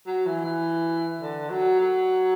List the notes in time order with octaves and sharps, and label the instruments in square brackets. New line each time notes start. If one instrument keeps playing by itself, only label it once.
[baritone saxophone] F#3
E3
E3
D3
F#3
F#3